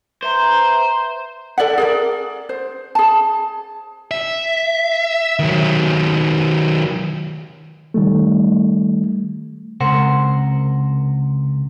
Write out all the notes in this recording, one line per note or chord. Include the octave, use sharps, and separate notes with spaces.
B4 C5 E5 A#5
A4 D5 E5 F#5
G#4 A#4 D5
C5
G#4 A5
E5
D#3 F#3
D#3 G3 A3
C#2 C3 A#4 C5 F#5